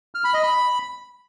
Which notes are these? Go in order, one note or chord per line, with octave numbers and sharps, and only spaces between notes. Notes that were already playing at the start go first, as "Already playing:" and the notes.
F6
B5
D#5
B5